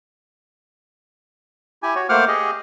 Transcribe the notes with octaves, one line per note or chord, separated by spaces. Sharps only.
E4 G4 G#5
F#4 C#5
A3 A#3 C5 F#5 D6 F6
G4 G#4 D#5